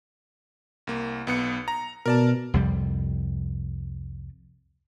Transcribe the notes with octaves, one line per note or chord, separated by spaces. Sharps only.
C2 A#3
B1 B3 C#7
A#5
B2 A#4 D5 A5
C2 F2 G3